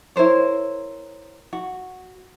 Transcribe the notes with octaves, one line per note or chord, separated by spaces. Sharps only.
E4 A#4 C5 C#5
F#4